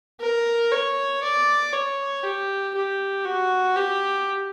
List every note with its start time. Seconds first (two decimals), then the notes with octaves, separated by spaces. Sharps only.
0.21 A#4
0.72 C#5
1.23 D5
1.73 C#5
2.23 G4
2.75 G4
3.25 F#4
3.76 G4